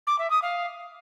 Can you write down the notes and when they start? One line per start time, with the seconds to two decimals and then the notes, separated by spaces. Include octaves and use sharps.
0.07 D6
0.19 E5
0.31 D#6
0.42 F5